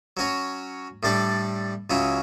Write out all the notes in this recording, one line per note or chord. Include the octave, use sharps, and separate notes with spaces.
F#3 C#4 F#4 C#5
A2 G3 D4 A4
C#2 C#3 F#3 C#4 E4